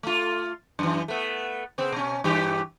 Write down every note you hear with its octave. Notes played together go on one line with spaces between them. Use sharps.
A3 F4
F#2 E3
A3 B3
C#3 B3 C4
B2 C#4
G2 E3 G4